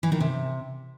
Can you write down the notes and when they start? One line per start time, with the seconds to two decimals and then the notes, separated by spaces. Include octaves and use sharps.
0.03 E3
0.12 D#3
0.20 C3